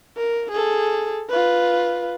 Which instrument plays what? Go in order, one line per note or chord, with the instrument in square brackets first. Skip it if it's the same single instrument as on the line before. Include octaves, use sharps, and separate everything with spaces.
[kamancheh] A#4
G#4 A4
F4 B4